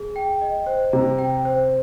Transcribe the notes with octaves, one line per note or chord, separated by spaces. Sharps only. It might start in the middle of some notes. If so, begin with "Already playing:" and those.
Already playing: G#4
G5
D#5
C5
C3 A#5
G5
C5